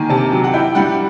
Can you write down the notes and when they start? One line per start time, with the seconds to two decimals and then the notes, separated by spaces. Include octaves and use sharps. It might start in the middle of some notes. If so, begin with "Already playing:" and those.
Already playing: D#3 A#3 G#5
0.09 C3 A5
0.32 F#3
0.44 F#5
0.54 E4 G5
0.75 G3 F#5